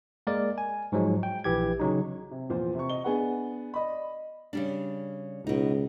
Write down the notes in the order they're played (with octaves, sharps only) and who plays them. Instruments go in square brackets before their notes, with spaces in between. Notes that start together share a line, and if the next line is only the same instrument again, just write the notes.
[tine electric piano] G#3 A#3 A#4 D5
G#5
G#2 F3 F#3 G#3
G5
A#1 E3 G4 G#6
C#3 F#3 D#4
[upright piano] C3
E2 A#2 F3 C5
C3 C#6
D#5 G7
B3 D4 G#4 B4 F#5
D5 D#5 B5
[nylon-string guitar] C#3 G3 D4
[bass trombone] C#2 [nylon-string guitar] B2 D#4